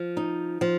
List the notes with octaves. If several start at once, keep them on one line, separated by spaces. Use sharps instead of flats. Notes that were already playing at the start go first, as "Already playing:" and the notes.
Already playing: F3
D#4
F3